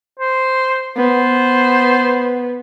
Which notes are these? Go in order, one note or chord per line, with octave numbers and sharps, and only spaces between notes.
C5
B3 C5